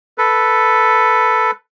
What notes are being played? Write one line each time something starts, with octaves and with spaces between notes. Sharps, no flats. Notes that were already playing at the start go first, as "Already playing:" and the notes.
A4 B4